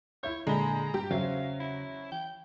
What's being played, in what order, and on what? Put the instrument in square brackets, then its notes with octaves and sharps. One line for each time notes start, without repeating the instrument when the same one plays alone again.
[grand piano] E4 E5 G6 [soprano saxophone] C#5
[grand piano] A#2 G7 [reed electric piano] D3 B5 [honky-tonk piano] G#3 [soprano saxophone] A#5
[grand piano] G2 [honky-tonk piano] G4
[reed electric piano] E2 C#3 [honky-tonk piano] F#3 [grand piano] C#4 C5 E5 [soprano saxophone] F5
[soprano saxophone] E4
[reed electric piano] E3 [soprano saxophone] G5